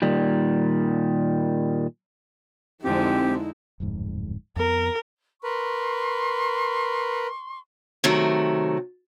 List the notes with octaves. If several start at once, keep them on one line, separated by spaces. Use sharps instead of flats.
A#2 D#3 G3
F2 D3 G#3 C4 D#4 E4 G4
D1 F2 G#2
F2 B3 A#4
A#4 B4 C6 C#6
C3 D#3 F#3 A3